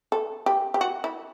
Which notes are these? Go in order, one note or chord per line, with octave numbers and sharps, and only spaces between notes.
A4
G4
G4
F#4
E4